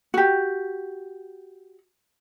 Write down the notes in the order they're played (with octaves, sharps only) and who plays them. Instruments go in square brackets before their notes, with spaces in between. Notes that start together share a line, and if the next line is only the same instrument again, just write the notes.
[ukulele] F#4 G4